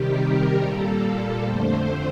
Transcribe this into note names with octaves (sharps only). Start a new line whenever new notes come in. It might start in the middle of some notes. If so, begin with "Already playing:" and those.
Already playing: C3 D#3 G3 G4
A#4
A#2 G3 A#3 A4
A4
F2 D3 A3 C5